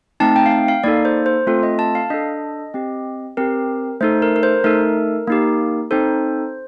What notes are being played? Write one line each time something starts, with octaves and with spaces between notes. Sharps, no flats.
A3 C4 D#4 A5
G5
F5
G5
F5
A#3 D#4 A4 D5
C5
C5
A3 C4 F4 A4
D#5
A5
F5
D4 A4 D#5
C4 G4
C4 G4 A#4
A3 D#4 A4 C5
A#4
A#4
C5
A3 D#4 A4 A#4
A#3 D#4 G4
C4 D#4 A4 C5